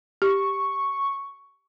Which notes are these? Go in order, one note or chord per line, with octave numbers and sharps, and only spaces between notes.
G4 C#6